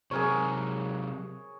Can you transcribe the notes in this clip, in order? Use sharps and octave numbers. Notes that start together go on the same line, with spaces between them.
C3 F#3 G#4 A#4 C#5